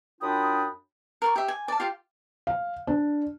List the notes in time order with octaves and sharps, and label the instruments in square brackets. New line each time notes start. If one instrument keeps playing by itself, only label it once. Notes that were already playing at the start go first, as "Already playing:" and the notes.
[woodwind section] F#2 D4 F4 G5 B5 D#6
[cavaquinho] A#4 D5 C#6
G4 E5
G#5
D5 A5
F4 G4 F5
[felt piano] F5
D4